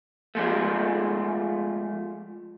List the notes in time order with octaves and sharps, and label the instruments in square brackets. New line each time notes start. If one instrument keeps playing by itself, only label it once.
[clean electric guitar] F3 G#3 A3